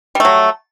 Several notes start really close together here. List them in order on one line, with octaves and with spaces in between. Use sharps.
G3 A3 F#3